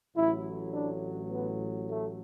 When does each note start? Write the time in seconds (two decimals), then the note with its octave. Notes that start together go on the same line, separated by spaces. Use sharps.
0.14 A1 A2 F#3 E4
0.72 D4
1.30 B3
1.88 A3